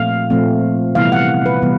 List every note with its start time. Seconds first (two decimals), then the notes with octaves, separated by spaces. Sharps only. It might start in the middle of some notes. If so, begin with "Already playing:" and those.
Already playing: A#2 F3 A3 C4 F5
0.30 A#2 F3 A3 C4
0.95 C3 E3 G3 B3 E4 F5
1.12 F#5
1.46 B4
1.62 C3 E3 G3 B3